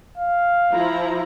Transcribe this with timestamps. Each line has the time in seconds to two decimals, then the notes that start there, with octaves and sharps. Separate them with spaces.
0.18 F5
0.72 F3 E4 A#5